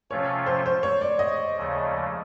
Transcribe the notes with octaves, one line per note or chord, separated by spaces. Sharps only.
C3 F3 A3 C#4 F4 C#5
C5
C5
C#5
D5
D#5
D#2 C#3 F3 A3